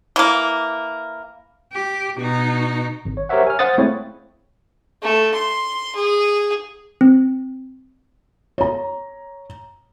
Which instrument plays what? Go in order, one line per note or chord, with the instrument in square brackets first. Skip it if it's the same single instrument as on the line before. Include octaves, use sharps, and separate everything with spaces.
[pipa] E3 A#3
[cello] G4
B2 D#4
[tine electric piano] G#1
C#5
G4 A#4 C5 C#5 E5 F#5
G#5 F6
C5 F5 F#5 D#6 A6
G#3 A3 C4 E4 C#5
[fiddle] A3
C6
G#4
[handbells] C4
[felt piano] C#5 A#5